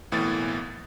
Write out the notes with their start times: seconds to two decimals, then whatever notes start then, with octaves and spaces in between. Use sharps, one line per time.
0.12 B1 A2 E3 A#3 B3 A6